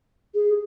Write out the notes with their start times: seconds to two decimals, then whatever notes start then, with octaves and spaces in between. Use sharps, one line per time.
0.35 G#4